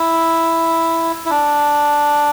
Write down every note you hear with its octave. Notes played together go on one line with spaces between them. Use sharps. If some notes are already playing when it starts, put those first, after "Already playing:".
Already playing: E4
E4
D4